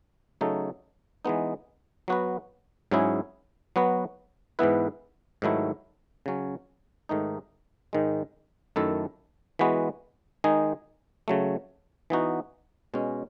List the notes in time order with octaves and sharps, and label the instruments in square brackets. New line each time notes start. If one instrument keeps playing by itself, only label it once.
[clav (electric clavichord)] C#3 F#3 A3 D#4 A4
E3 G#3 B3 D#4
F#3 B3 F#4 B4
G#2 F#3 C#4 E4 G#4
F#3 B3 F#4 B4
G#2 E3 B3 E4 B4
G#2 D#3 F#3 A3 E4
C#3 F#3 C#4
G#2 D#3 A3 D#4
G#2 D#3 G#3
F#2 D#3 A3 E4 A4
E3 G#3 B3 F#4 B4
D#3 G#3 D#4 G#4
C#3 F#3 A3
E3 B3 D#4 F#4
B2 G#3 C#4